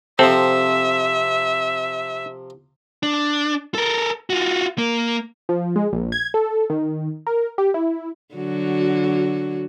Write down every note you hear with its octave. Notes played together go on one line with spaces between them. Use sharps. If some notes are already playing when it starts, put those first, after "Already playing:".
C3 F3 C4 A4 E5
D4
A4 A#4
F4 F#4
A#3
F3
G#3
A#1
G#6
A4
D#3
A#4
G4
E4
D3 F#3 F#4